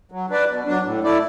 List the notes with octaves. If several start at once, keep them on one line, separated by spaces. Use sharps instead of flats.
F#3
D4 B4 D5
B2
F#3 D4
A2
A3 E4 D5